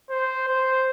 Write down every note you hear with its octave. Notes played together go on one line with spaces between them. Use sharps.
C5
C5